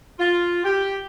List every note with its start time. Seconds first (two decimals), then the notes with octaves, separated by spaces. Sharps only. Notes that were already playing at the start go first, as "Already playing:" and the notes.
0.19 F4
0.64 G4